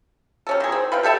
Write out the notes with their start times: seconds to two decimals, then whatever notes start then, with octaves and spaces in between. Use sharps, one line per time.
0.47 G3 C#4 A4
0.60 D#3 G#4
0.72 C4
0.92 B4 F5 G5
1.03 A3 G4 A4 E5